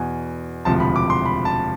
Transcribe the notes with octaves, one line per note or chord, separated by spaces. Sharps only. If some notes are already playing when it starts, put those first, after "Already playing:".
Already playing: E2 B2 G#5
E1 D2 C3 F3 A5
B5
D6
C6
B5
A5